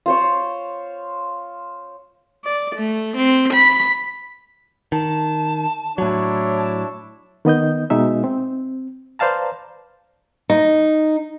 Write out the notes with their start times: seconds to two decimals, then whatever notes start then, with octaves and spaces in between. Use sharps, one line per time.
0.06 F4 C5 C#5
2.45 D5
2.76 A3
3.16 C4
3.53 B5
4.92 D#3 A5
5.98 A2 F#3 D4 E4 C#5
6.58 A5
7.45 D#3 B3 D#5 G6
7.90 B2 G#3 D#4 E5
8.24 C4
9.19 B4 C5 D5 F5 A5 A#5
10.50 D#4